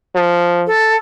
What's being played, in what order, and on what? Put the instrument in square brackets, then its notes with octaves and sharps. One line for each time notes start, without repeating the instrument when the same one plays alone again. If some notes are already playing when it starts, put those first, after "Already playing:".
[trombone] F3
[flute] A4